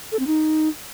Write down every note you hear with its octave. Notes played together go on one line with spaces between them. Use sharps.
A4
C4
D#4